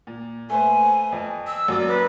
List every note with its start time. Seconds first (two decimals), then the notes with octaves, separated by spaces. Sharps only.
0.07 A#2
0.50 A3 B4 C5 G#5
1.12 F2
1.47 E6
1.68 F#2 A#3 D5
1.88 B4